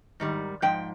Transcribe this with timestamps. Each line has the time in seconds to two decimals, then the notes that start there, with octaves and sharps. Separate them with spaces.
0.20 G#2 D#3 G3
0.62 G#2 F3 G5